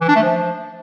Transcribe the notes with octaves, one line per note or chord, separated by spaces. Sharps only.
E3
D4
A3
F3